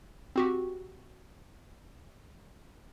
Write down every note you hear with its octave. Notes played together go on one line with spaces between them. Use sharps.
C4 F#4 G4